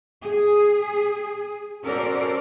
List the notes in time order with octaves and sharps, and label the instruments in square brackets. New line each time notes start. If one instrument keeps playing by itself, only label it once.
[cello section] G#4
C#4 F#4 A4 A#4 C5 D5